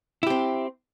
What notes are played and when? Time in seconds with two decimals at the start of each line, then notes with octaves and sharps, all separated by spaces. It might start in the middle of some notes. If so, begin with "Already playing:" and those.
0.23 E4
0.27 G4
0.30 C4